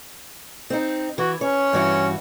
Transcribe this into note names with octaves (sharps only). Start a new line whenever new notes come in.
C4 D#4
E3 F#4
C#4 C#5
G2 E3 F#4